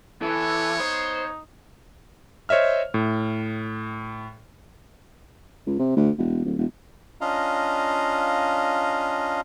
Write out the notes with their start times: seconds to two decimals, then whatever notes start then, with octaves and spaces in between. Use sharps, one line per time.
0.22 E3 B3 A4 C#5
0.80 D#4 C5
2.49 C5 C#5 D#5 E5 F6
2.94 A2
5.67 C#2
5.79 C3
5.97 D2
6.18 E1
6.45 D1
6.58 E1
7.21 C#4 D4 F4 D#5 F5 A#5